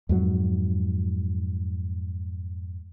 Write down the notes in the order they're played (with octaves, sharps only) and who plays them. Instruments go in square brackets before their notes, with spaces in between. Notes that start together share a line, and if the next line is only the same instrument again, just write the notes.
[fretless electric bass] F2 G#2 F#3